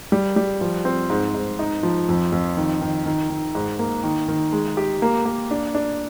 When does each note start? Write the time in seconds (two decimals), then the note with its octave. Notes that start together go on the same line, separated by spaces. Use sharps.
0.12 G3
0.36 G3
0.61 F3
0.85 C4
1.10 G#2
1.34 G#2
1.59 D#4
1.83 F3
2.09 F2
2.32 F2
2.57 D#3
2.81 D#3
3.06 D#3
3.30 D#3
3.55 G#2
3.79 A#3
4.03 D#3
4.28 D#3
4.53 G#3
4.77 G4
5.02 A#3
5.25 A#3
5.51 D4
5.75 D4